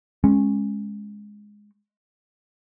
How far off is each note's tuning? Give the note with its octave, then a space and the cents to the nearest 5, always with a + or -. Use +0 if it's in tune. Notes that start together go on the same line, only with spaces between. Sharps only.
G#3 +0 C#4 -20